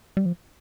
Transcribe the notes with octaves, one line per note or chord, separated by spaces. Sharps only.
G3
F3